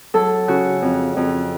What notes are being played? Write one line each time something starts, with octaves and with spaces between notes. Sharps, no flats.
F#3 A4
C#3 F#4
F2
F2